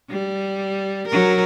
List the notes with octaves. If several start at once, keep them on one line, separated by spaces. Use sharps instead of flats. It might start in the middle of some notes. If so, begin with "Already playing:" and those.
G3
F#3 A#4